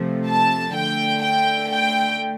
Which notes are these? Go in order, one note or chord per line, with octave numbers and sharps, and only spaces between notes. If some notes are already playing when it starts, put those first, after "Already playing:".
Already playing: C3 F3 A3
A5
D3 A3 G5
G5
G5